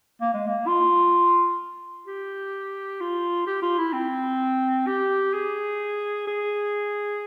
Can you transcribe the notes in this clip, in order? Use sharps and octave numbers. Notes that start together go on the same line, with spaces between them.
A#3
G#3
A#3
F4
G4
F4
G4
F4
E4
C4
G4
G#4
G#4